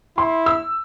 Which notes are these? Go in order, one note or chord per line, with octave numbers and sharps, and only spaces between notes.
E4 C6
E6